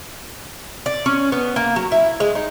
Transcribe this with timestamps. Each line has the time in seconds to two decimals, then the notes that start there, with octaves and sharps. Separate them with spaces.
0.86 D5
1.06 C#4
1.32 B3
1.56 A#3
1.76 F#3
1.92 E4
2.20 G#3
2.35 D#4